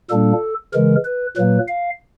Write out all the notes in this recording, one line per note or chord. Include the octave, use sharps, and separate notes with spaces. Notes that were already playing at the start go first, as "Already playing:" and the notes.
A#2 G3 A#3 D4 A4
C#3 E3 G#3 A#4
B4
A#2 F#3 A#3 B4
F5